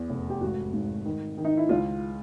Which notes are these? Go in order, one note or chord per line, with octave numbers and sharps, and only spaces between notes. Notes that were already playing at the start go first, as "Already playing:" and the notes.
Already playing: E2
F1
G4
G#1 F#4
G#2
D#3
D#3
D#4
E4
C#2 F4